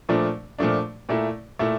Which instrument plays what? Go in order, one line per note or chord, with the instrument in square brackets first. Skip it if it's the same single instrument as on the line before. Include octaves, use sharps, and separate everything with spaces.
[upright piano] A#2 F3 A3 D4
A#2 F3 A3 D4
A#2 A3 E4
A#2 A3 E4